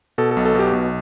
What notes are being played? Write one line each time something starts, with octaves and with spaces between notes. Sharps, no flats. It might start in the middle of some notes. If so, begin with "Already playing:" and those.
B2 A4
A4
B1
A4
B2 G4
B1